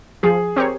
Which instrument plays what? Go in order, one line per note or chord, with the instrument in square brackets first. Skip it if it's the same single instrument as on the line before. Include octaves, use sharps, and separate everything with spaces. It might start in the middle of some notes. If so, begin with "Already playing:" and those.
[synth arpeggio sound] F3 [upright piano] G#4
[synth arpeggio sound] C4 G4 A#4 C#5